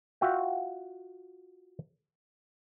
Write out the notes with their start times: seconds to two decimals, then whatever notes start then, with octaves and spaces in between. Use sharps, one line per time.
0.21 F4 F#4 E5 G5